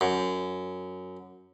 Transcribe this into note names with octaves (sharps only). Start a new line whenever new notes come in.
F#2